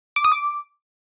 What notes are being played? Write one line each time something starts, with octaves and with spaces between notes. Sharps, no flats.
D6
D#6
D6